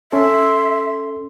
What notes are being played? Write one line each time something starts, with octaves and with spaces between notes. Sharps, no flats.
C#4 A4 E5 C6